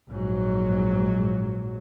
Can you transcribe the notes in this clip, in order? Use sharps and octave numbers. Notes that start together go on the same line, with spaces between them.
A#1 G#2 F#3